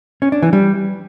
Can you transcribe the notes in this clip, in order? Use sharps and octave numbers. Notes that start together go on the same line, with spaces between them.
C#4
D4
E3
G3